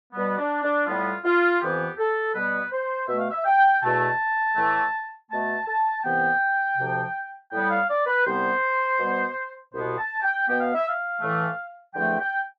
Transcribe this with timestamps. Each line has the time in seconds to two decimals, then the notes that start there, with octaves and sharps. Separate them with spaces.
0.13 B2 G3 B3
0.38 D4
0.62 D4
0.86 A2 G3 B3 F4
1.24 F4
1.61 F2 E3 B3 G4
1.98 A4
2.34 B2 G3 B3 B4
2.71 C5
3.08 B2 A3 E5
3.19 F5
3.31 E5
3.45 G5
3.82 E2 B2 A3 A5
4.56 A2 E3 A3
5.30 B2 A3 A5
5.67 A5
6.03 C2 C3 E3 B3 G5
6.78 D2 C3 F3
7.52 A2 G3 B3 G5
7.70 F5
7.89 D5
8.06 B4
8.25 C2 C3 G3 B3 C5
8.99 B2 G3 B3
9.74 C2 B2 B3 C5
9.98 A5
10.22 G5
10.47 B2 B3 G5
10.60 F5
10.75 E5
10.88 F5
11.20 A2 E3 A3
11.95 E2 D3 F3 A3 G5
12.19 G5